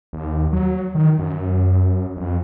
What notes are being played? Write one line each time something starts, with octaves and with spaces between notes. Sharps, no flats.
D#2
F#3
D#3
F#2
F2